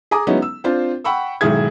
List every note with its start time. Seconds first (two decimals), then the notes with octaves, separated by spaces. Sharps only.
0.11 G#4 G#5 A#5 D6 D#6
0.27 F#3 G#3 B3 C#4 D#4 E4
0.42 E6
0.64 C4 D4 F4 C5
1.04 F#5 G5 B5 C#6 E6
1.41 B1 G#2 D#3 E4 G#4 G#6